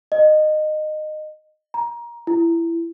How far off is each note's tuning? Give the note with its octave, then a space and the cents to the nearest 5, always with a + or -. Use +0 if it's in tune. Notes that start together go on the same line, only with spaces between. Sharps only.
D#5 -20
A#5 +20
E4 +20